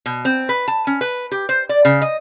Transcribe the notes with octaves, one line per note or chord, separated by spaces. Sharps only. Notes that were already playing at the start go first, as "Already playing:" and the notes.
B2
C4
B4
A5
C#4
B4
G4
C5
D5
C#3
D#5